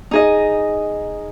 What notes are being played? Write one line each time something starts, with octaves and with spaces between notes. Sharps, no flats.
D#4 G#4 D#5